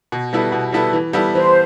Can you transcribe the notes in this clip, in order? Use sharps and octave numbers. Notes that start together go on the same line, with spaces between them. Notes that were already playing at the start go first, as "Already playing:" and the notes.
B2
G3 B3 E4 A4
B2
G3 B3 E4 A4
E3
G3 B3 E4 A4
E3 C5